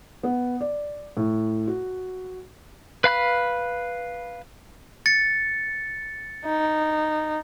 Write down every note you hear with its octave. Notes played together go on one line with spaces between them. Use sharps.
B3
D5
A2
F#4
B4 F5 B5 F#6
A6 C#7
D#4